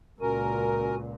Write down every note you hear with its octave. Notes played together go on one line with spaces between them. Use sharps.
C#2 A#2 C#4 F#4 A#4 G#5